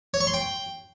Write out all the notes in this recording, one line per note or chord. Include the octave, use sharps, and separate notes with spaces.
C#5
C#6
C6
G5